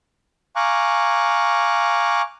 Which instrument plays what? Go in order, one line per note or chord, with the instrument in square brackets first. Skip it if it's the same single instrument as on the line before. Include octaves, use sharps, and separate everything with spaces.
[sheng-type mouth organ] F5 G#5 A#5 C#6 D6 F#6